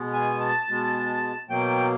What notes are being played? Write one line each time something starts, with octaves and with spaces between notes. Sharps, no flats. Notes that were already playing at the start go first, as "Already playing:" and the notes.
Already playing: B2 G#3 B3
G#5
A5
B2 G#3 B3
B2 F#3 A#3 G5